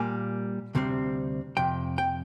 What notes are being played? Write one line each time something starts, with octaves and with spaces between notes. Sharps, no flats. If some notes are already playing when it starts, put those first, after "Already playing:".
Already playing: A#2 G3 A#3 G#5
D2 C3 G3 C4
F2 C3 G5
G5